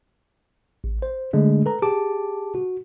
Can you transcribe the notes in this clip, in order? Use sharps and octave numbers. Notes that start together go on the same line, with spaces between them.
A1
C5
D3 G#3 A3 D4
A4 B4 A#5
G4 G#4 A5 D6
F#4